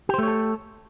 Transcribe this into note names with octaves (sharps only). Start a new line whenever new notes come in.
A3 G4 A4 C5 C#5